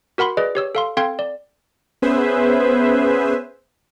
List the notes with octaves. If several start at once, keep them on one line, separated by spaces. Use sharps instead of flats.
F#4 A#4 F#5 B5 C6
G#4 B4 D5 D#5
G4 C#5 E6
A4 F5 C6
C4 A4 F5 G5 C6 G#6
D5
B3 C#4 G#4 B4 C5 E5